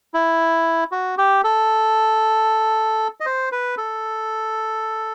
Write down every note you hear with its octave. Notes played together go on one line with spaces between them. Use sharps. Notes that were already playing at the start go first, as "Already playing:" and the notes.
E4
F#4
G4
A4
D#5
C5
B4
A4